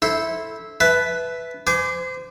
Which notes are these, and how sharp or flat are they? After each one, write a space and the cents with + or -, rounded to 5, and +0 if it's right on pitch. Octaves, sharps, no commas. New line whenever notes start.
E4 -10 A4 +0 C5 +0
B4 +5 E5 +0 A5 -25
C5 -30 G#5 +5 D6 +0